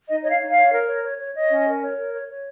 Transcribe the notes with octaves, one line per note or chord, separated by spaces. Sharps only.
D#4 D#5
C#5 D#5
F5
D#4
F5
C#5
A#4
C#5
C#5
C#5
C#5 D#5
C#4
A#4
C#5
A#4
C#5
C#5